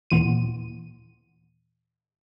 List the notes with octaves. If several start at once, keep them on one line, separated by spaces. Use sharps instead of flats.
D#2 A#2 E3 D#7